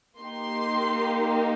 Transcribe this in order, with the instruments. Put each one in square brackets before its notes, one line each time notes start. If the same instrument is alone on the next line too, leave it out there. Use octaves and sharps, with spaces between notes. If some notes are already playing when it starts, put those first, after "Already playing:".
[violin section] A#3 D#4 G4 C6